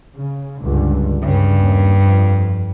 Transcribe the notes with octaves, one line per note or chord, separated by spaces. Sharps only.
C#3
C#2 G2 D3
G2 C#3
D#2
F2